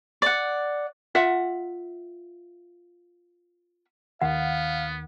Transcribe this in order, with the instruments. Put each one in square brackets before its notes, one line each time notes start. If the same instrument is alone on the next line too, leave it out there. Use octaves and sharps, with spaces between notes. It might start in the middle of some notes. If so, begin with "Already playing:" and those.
[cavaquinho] D5 F#5
[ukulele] F4 E5 F#5
[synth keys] D#2 D#3 [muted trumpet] B3 [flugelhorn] F5 [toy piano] F#5